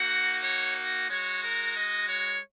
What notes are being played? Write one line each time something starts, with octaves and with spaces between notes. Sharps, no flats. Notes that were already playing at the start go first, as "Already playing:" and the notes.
Already playing: A#3 D#4 F#4 F#5
C#5
G#3 F#4 C#5
A#4
D#5
C#5